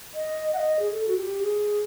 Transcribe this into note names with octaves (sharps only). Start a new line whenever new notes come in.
D#5
F#5
D#5
G#4
A4
F#4
G4
G#4